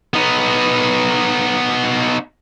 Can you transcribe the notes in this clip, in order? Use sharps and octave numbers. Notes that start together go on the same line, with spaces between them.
B3 D#4